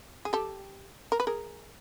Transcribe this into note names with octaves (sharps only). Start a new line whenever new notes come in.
G#4
G4 A4
A#4
B4
G#4 A#4